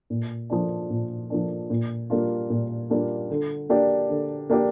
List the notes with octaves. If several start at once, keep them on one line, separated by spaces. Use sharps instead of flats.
A#2
F3 A#3 D4
A#2
F3 A#3 D4
A#2
G3 A#3 D4 F4
A#2
G3 A#3 D4 F4
D3
A#3 D4 G4 D5
D3
A#3 D4 G4 D5